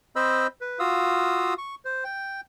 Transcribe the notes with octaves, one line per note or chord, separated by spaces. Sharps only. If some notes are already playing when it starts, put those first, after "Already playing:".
C4 C5 D#5 B5 E6
B4
F4 F#4 F5 D#6 E6
C#6
C5
G5